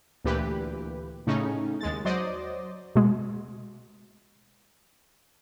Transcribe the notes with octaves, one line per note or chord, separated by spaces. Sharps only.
D2 A#2 E3 G4 B4
A2 C#3 C#4 D#4
D#2 G#3 A6
F#3 C5 D5 D#5
B2 G#3